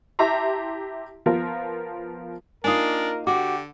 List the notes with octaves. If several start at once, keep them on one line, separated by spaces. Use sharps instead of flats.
E4 G4 E5 A5 A#5 C6
F3 B3 F4 A#4
A#3 D4 D#4 F4 A#4 G#5 D#6
D3 F#4 G4 D6